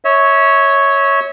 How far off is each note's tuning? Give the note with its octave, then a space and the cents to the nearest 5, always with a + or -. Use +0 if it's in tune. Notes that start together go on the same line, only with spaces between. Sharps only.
C#5 +0 E5 -30